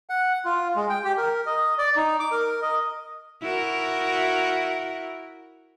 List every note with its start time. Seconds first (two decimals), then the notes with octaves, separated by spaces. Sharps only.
0.10 F#5
0.45 F4
0.76 G#3
0.89 G5
1.04 G4
1.18 A#4
1.46 D#5
1.78 D5
1.96 D#4
2.20 D6
2.32 A#4
2.62 D#5
3.42 E4 F#4 A#4